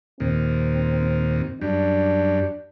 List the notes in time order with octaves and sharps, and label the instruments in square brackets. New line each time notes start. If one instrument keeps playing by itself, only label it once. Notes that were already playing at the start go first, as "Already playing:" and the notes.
[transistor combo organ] D#2 A#2 [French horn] C4
[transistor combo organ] F#2 G3 [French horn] D4